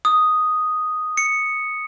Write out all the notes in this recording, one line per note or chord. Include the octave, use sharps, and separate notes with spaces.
D#6
C#7